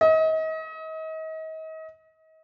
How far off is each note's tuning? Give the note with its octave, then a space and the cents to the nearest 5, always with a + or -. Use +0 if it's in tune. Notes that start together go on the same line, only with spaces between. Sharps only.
D#5 +35